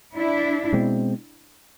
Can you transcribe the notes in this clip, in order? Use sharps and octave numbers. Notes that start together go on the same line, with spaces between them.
D4 E4
B2 G#3 C4